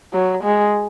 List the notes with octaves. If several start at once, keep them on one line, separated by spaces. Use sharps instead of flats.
F#3
G#3